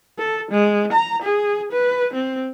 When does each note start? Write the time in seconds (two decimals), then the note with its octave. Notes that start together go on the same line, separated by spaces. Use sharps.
0.18 A4
0.51 G#3
0.92 A#5
1.22 G#4
1.72 B4
2.13 C4